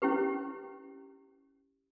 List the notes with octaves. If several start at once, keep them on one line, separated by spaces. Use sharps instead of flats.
C#4 E4 G4 B4